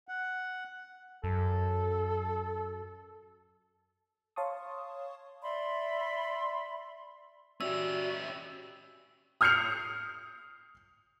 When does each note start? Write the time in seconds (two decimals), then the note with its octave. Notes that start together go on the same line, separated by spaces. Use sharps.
0.09 F#5
1.24 F#2 A4
4.36 C#5 F5 A5 C6 C#6 D#6
5.42 D5 E5 B5 C6
7.61 C#4 F#4 G4 D5 E5 E6
9.41 D#6 F6 G6 C7 C#7 F7